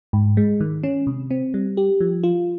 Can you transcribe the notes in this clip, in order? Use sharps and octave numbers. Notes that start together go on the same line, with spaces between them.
G#2
G#3
D#3
C#4
C3
C4
G3
G4
F3
F4